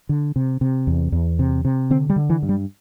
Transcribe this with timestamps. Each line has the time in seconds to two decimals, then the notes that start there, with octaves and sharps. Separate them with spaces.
0.09 D3
0.36 C3
0.61 C3
0.87 E2
1.12 E2
1.39 C3
1.65 C3
1.90 D3 C4
2.10 G3
2.16 D3
2.30 E3
2.43 G2
2.49 G3